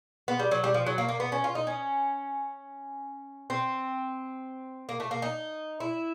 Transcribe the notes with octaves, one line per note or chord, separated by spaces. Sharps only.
B3
G3
F#3
G3
F3
F#3
A#3
A#3
B3
C#4
F4
D#4
C#4
C4
A#3
A3
A#3
D#4
E4